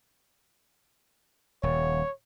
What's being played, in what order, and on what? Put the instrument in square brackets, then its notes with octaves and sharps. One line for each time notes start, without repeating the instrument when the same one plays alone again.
[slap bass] D#1 [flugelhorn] C#5